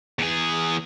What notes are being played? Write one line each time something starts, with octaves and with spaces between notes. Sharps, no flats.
E2 G#4